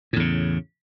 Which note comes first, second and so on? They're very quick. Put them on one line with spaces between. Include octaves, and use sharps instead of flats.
A2 E2 C#3